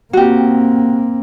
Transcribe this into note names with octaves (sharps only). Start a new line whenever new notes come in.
A#3 C4 F#4 G4